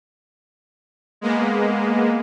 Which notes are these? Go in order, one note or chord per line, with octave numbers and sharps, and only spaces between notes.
G#3 A#3 B3